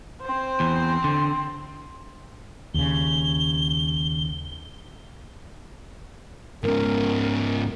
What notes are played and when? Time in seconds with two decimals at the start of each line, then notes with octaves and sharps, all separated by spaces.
0.21 C4 C5
0.60 E2
1.04 D3
2.74 D#2 C#3 G7
6.64 G#2 C#3 A#4